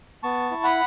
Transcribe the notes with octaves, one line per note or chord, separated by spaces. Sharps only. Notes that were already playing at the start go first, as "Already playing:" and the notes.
B3 A5 C#6
E4
F#5 B5